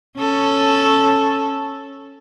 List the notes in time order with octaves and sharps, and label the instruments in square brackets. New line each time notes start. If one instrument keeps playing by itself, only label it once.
[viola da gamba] C#4 A4